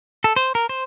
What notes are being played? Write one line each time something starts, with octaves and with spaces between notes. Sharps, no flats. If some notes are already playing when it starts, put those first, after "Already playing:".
A4
C5
A#4
C5